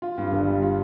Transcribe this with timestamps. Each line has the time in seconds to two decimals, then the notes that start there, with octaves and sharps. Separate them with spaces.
0.02 F4
0.18 G2
0.32 G1
0.47 G3
0.62 F4